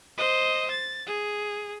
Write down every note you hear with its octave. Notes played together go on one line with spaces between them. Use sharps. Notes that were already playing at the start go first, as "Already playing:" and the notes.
C5 D#5
A6
G#4